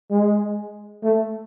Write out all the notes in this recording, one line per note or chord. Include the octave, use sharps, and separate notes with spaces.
G#3
A3